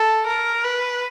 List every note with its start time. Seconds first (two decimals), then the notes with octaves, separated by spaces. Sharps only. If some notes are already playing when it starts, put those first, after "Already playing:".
Already playing: A4
0.26 A#4
0.64 B4